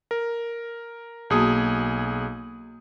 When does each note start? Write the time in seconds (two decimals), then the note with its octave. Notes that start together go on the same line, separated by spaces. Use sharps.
0.11 A#4
1.30 B1 A#3 F#4 G#4 A5 D#6